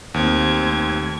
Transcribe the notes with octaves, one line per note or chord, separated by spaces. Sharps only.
D#2 A3 C4 G#6